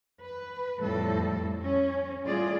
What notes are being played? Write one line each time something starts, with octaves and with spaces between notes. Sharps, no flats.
B4
F2 A2 G3 A4
C#4
A2 G3 F4 G#4 D5